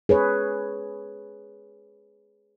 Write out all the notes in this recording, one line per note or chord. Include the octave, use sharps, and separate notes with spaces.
G#4 B4 C#5